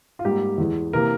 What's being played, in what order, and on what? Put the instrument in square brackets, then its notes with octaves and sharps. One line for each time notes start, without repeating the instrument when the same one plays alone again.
[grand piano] F4
G#2 G3 A#3 G4
E2 E3 G#3
C3 E3 A#3 A#4